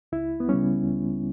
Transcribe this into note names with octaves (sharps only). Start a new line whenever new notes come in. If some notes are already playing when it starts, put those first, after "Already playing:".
C#2 E4
B3
C#3 G3 C#4
C#2